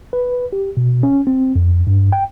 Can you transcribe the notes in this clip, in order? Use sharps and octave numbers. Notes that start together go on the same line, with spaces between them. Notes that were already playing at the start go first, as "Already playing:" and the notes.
B4
G4
B2
C#4
C4
F2
G2
G5